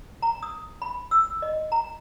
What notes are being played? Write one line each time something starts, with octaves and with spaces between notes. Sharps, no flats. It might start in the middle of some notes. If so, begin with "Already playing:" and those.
A#5
D#6
B5
E6
D#5
A#5